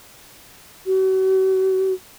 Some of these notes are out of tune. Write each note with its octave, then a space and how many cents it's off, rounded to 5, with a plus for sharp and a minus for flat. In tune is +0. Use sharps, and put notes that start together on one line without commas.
F#4 +40